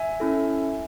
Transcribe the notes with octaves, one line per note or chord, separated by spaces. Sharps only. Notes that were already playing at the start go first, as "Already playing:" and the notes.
Already playing: E5 G#5
C#4 E4 A4